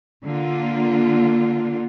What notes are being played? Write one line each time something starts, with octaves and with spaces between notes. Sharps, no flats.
D3 A#3 F4